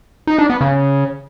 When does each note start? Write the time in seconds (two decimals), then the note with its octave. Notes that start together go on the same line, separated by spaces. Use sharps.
0.27 D#4
0.39 D4
0.50 B3
0.61 C#3